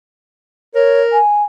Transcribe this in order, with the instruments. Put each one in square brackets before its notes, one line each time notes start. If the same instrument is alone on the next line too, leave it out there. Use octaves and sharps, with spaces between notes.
[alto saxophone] A#4 [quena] C#5
[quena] G#5